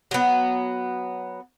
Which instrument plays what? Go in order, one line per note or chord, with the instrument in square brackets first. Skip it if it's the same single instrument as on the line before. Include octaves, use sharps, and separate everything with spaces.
[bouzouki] F#3 B3